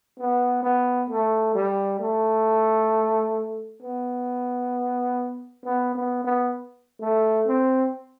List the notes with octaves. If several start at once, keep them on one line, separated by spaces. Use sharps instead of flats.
B3
B3
A3
G3
A3
B3
B3
B3
B3
A3
C4